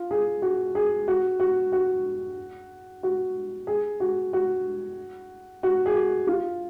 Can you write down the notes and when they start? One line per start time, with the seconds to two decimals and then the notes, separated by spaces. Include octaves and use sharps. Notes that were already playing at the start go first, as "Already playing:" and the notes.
Already playing: F4
0.11 G#4
0.42 F#4
0.75 G#4
1.08 F#4
1.40 F#4
1.72 F#4
3.03 F#4
3.67 G#4
4.00 F#4
4.33 F#4
5.63 F#4
5.86 G#4
5.95 F#4
6.27 F4